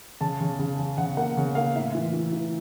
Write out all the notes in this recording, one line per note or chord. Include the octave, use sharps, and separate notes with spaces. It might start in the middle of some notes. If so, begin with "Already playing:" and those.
C#3 A5
C#3
C#3
C#3
C#3 F#5
A#3 F#5
C#3
A#3 F5
A2 E5
E3
E3
E3